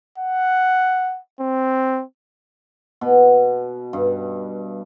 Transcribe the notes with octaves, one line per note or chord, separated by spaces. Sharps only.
F#5
C4
B2
G2